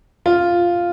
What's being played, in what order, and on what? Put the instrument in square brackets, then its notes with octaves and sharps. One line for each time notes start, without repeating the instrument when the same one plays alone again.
[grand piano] F4